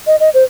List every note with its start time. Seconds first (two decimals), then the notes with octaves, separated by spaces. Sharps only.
0.07 D#5
0.20 D#5
0.34 C5